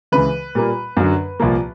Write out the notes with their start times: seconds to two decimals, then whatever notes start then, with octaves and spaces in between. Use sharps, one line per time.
0.12 C#2 C#3 E3 B4
0.55 A#2 G3 A#3
0.97 F#2 D3 F#3
1.40 C2 A#2 F3 A#3